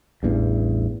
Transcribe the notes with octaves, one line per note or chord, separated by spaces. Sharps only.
A1 E2 G2